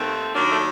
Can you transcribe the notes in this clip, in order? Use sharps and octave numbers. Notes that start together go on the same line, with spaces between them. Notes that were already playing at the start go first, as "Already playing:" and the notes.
Already playing: D#2 D#3 A3 C4
D#2 D#3 F#3 A#3 D4
A3